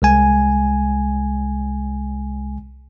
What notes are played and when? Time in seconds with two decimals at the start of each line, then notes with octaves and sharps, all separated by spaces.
0.02 C2 G#3 G#5